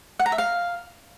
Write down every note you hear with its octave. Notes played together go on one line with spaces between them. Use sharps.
F#5
A#5
E5
F5